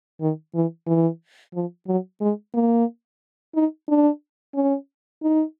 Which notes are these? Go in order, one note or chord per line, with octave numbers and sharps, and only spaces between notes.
D#3
E3
E3
F3
F#3
G#3
A#3
D#4
D4
C#4
D#4